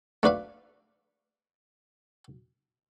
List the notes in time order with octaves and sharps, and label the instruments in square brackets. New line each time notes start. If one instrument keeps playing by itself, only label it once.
[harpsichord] A3 D4 B4 F5